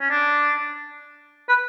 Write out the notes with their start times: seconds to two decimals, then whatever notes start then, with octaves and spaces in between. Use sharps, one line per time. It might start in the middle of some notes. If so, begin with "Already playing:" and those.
0.01 C#4
0.10 D4
1.49 B4